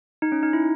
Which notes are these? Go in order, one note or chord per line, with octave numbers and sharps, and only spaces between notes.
D#4
C#4
D#4
E4